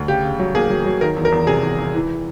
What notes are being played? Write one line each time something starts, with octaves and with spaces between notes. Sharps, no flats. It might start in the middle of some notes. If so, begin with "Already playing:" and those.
Already playing: D2
C#3 G4
C#3
F#3
A#3 G#4
F#3
F#3
D#3 A#4
E2
A#4
E2
C3 G#4
E2
E2
E3